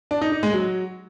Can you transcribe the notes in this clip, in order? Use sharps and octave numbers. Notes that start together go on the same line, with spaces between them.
D4
D#4
D#4
G#3
F#3